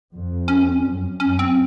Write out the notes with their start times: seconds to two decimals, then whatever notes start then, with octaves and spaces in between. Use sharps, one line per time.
0.11 F2
0.48 C#4
0.62 C4
0.74 C#4
0.85 F#2
1.20 F#2 C#4
1.39 C4